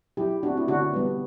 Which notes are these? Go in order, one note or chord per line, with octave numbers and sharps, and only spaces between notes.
F#3 E4 G4
A3 C4 D4 F#4
E4
D3 D4 F#4
G3 B3